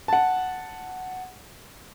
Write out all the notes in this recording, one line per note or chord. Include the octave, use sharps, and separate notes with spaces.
F#5 A5